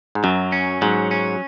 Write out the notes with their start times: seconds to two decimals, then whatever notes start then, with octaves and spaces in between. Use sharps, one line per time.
0.15 G#2
0.24 F#2 F#3
0.52 C#4
0.82 G#2 F#3
1.11 C#4